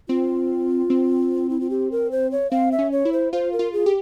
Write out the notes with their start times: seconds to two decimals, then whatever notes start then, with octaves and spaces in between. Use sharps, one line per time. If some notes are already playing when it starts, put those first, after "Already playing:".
0.09 C4 F4
0.90 C4
1.50 E4
1.61 F4
1.70 G4
1.92 A#4
2.12 C5
2.31 C#5
2.51 C4 F5
2.72 E5
2.79 C#4
2.92 C#5
3.05 E4
3.13 C5
3.33 F4 C5
3.53 A#4
3.59 F4
3.73 G#4
3.86 G4